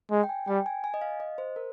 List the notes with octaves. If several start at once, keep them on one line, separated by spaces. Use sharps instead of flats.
G#3
G5
G#5
G3 G5
G#5
G#5
D#5
F5
D#5
C5
A#4